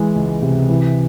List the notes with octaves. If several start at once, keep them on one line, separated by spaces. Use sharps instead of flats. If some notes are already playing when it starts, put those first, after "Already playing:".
Already playing: E3 G#3
C#2
C3
E3